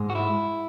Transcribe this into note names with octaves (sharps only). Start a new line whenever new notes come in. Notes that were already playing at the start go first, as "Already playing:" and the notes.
Already playing: G#2 G#3
F#4
E4